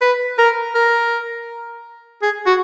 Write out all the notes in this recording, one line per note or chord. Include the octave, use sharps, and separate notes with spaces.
B4
A#4
A#4
G#4
F#4